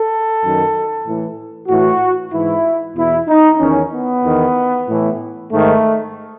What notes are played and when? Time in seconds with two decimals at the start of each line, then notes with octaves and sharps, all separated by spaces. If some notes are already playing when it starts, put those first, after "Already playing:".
Already playing: A4
0.41 F#2 D#3
1.05 A2 E3
1.68 A2 E3 F#4
2.32 G#2 E3 E4
2.95 E2 B2 E4
3.28 D#4
3.59 E2 D#3 C#4
3.91 B3
4.23 E2 D#3
4.87 A2 E3
5.50 G#2 D#3 A3